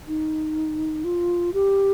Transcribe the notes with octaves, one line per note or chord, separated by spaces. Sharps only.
D#4
F4
G4